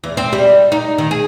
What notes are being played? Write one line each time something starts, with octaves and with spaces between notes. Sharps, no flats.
E2
C4
G3
D#4
D#3
G#4